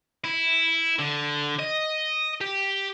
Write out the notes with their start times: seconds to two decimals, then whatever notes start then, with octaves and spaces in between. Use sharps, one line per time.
0.25 E4
0.99 D3
1.59 D#5
2.41 G4